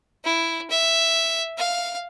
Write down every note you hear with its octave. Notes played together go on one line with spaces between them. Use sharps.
E4
E5
F5